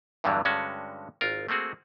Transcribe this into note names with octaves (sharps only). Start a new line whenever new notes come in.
E2 G2 D3 E3 F#3 G3
G2 D3 G#3 C#4 F#4
G#1 F4 A#4
A3 A#3 C4 F#4 G#4